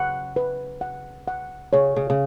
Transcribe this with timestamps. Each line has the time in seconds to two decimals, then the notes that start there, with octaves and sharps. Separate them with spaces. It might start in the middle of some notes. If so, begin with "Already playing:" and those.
Already playing: C#3 F#3 F#5
0.36 B4
0.81 F#5
1.28 F#5
1.73 C#3 C#5
1.96 C#3
2.10 C#3